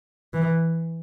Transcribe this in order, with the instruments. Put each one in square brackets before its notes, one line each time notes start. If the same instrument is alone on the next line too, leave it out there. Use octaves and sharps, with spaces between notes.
[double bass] E3